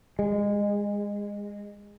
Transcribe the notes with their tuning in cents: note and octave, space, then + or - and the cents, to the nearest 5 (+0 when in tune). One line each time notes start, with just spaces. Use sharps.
G#3 -20